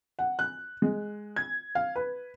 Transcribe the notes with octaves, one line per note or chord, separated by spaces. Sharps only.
F#5
F#6
G#3
G#6
F5
B4